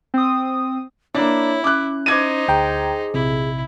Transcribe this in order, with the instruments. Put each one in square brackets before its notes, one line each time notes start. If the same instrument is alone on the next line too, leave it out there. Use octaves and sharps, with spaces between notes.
[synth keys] C4 D#6
[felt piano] A#3 D4 [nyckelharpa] E4 [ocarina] C#5
[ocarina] C#4 [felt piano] D6 F#6
[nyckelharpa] D#4 C5 [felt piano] D6 G#6 D#7
[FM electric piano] D2 G5 A#5 [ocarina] G#4
[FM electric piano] A#1 C3 [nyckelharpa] E4